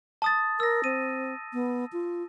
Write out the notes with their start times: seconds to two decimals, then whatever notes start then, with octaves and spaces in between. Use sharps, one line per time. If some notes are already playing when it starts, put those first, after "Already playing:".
0.22 A5 D#6 A6
0.60 A#4 E6 A#6
0.84 C4 D#7
1.53 B3
1.93 F4